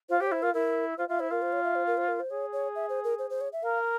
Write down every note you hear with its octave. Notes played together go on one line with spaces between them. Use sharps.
F4 C5
G4 C5
C#5
E4 C5
F4 A#4
E4 A#4
F4 C5
F4 E5
E4 C5
F4 A#4
C5
C#5
E5
C5
A#4
C5
A#4
C5
G#4 C#5
C#5
E5
C5
A#4
C5
C5
C#5
E5
A#4 F5